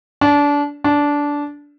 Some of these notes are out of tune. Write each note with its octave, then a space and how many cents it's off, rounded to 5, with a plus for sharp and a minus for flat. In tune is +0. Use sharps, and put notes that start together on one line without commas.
D4 -25
D4 -15